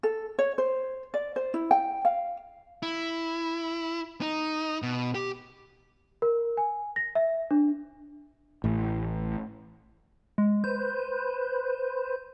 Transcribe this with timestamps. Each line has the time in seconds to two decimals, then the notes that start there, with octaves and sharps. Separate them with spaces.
0.03 A4
0.39 C#5
0.58 C5
1.14 D5
1.36 C5
1.54 E4
1.71 G5
2.05 F5
2.83 E4
4.21 D#4
4.82 B2
5.15 G4
6.22 A#4
6.57 G#5
6.96 A#6
7.15 E5
7.51 D4
8.64 A1 A2
10.38 G#3
10.64 B4 C5 G6